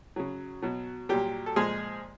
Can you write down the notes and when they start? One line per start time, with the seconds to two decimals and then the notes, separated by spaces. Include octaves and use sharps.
0.16 C#3 F#3
0.63 B2 F#3
1.09 A#2 F#3 G3 G4
1.46 A4
1.56 A#2 F3 G#3 G#4